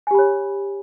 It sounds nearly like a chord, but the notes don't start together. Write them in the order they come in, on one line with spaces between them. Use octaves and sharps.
G#5 G4 B5 C#5